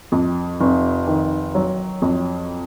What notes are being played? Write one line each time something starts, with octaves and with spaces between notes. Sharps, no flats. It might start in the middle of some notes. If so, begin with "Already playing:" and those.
F2
F1
D#3
F#3
F2